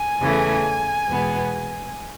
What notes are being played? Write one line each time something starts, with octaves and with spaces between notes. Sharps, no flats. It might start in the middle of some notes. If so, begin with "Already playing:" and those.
Already playing: G#5
E2 C#3 E3 A3
E2 B2 G#3 B3